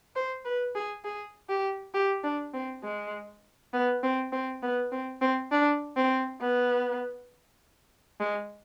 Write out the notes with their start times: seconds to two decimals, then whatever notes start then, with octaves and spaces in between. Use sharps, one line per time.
0.16 C5
0.45 B4
0.75 G#4
1.04 G#4
1.49 G4
1.94 G4
2.24 D4
2.54 C4
2.84 G#3
3.73 B3
4.03 C4
4.32 C4
4.63 B3
4.92 C4
5.21 C4
5.52 D4
5.97 C4
6.41 B3
8.20 G#3